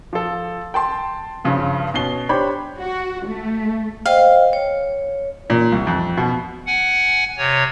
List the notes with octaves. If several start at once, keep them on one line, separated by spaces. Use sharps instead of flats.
F3 A4
G5 A5 C6
G2 C#3 F3
B2 C#4 C7 G7
D4 G4 C5 C#5 B5
F#4
A3
C5 D#5 F5 G5
C#5
A#2
C2
F2
B2
F#5 G#5
C3 C#5